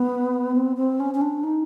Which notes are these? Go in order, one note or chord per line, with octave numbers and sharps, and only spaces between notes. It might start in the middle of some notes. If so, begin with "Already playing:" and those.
Already playing: B3
C4
C4
C#4
C#4
D4
D#4